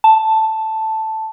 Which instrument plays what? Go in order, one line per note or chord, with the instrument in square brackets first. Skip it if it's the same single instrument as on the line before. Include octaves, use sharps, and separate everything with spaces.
[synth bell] A5